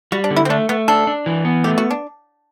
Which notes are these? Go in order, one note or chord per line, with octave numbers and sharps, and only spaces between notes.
G3 F#4
D4
D3
E4
C4
A3 D4
A3 B3
D4 A4
D4
E3
B3
A3 G4
F#4
D4